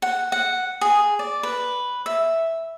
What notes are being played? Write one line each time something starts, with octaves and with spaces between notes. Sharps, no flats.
F#5
F#5
G#4
D5
B4
E5